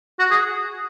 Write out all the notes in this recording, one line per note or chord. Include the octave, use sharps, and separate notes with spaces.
F#4
G#4